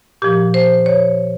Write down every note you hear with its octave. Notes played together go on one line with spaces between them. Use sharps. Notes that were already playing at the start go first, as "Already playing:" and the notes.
A#2 F3 G4
C5
C#5